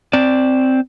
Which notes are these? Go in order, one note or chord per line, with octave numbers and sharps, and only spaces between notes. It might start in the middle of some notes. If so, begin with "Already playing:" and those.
C4 D5